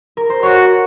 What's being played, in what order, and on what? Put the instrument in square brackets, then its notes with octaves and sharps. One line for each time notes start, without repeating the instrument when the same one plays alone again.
[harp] A#4
C5
[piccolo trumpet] F#4 [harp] C#5